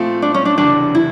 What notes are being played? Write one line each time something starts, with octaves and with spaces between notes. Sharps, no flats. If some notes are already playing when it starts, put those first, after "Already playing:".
Already playing: A#2 F3 A3 C4 F4
D4
C#4
D4
F#1 E2 C3 E3 D4
E4